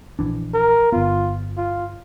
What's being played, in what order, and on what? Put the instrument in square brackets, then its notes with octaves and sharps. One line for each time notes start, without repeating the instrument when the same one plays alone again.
[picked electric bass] A#1 E3 D4
[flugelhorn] A#4
[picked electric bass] G1 B3 [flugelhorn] F4
[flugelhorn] F4